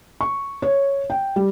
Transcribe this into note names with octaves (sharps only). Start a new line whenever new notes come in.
C#6
C#5
G5
G3